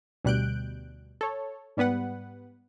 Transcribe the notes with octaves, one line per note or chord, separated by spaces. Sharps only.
D2 B2 G3 F#6 G6 D7
A4 C#5
G#2 G3 B3 B4 F#5